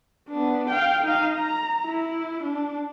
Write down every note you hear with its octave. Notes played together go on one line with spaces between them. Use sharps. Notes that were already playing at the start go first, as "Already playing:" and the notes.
B3 D4
F5 G5
D#4 F5
A#5
E4
D4